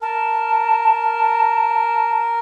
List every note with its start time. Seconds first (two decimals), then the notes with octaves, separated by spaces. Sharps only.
0.02 A#4 A5